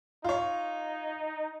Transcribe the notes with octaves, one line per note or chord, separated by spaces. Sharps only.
D#4 F4 C#5